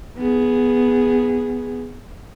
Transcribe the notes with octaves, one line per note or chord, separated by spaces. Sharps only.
B3 G#4